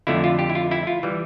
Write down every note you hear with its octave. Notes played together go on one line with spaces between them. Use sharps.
F2 D3 A3 E4
F4
G4
E4
F4
E4
F4
E3 G3